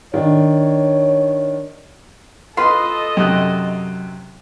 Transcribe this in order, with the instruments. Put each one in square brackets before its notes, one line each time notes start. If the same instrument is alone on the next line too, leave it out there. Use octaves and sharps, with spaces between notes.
[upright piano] D#3 D4 [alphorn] C#5
[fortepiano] F4 B4 [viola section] A4 D#5 [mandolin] C6
[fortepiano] F#2 C3 F#6